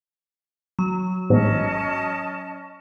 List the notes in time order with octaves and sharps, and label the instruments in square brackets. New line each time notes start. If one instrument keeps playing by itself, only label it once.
[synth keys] F#3
[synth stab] A1 E2 G#2 [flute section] C#4 D#5 A5